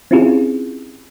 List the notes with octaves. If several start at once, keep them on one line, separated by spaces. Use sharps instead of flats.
C4 C#4 E4 F4 G4 G#4